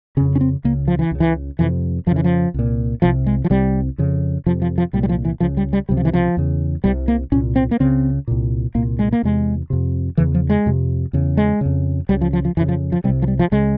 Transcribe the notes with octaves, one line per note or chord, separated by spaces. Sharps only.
F2 C#3 C#4
C#4
C4
C#2 C#3 A#3
F3
E3
C#2 C#3
E3
F2 C3 E3
F2 C#3 F3
E3
F3
C2 A#2
C2 C3 F3
G#3
F3
C2 C3 G3
F2 C#3
F2 C3 F3
F3
F3
C2 A#2 G3
G3
F3
E3
C#2 C#3 F3
G3
G3
C#2 C3 G3
F3
E3
F3
E2 C#3
C2 C3 G3
A#3
C2 A#2 C#4
C4
A#3
C#2 C#3 C4
C2 A#2
C2 A#2 A#3
G#3
A#3
E2 C3 G#3
F2 C3
E2 C#3 E3
F3
G#3
F2 C3
E2 C#3
G#3
F2 C#3
C#2 C#3 G3
F3
F3
F3
F2 C#3 E3
F3
F3
C2 C3 G3
F3
G3
F3
C#2 C#3 G#3